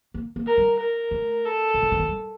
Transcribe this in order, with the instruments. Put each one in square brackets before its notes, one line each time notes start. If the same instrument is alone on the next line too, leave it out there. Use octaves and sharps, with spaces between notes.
[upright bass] A#3
A#3
[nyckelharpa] A#4
[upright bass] G3
[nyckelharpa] A#4
[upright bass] A3
[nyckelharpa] A4
[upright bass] C3
D3
D#3
F3
G3